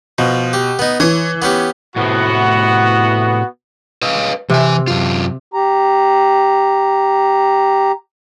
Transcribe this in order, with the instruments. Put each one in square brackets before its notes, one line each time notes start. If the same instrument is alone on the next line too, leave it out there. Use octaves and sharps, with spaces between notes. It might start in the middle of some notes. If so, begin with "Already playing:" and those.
[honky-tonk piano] B2 [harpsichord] F3
[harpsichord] G4
B3 D#4
[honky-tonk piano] E3 [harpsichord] C#5 D#6
[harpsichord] B3 C#4 G4
[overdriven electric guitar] A2 C3 [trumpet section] B3 F#4
[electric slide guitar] B4 D#5 F5
[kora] C3 [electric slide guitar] E3 G#5
[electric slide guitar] F#2 F4
[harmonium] G4 A#5